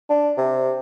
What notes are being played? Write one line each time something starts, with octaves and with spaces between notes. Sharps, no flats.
D4
C3